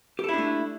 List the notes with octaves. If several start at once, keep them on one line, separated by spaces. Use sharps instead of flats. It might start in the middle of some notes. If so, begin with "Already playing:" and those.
A3 D4 E4 G4 A4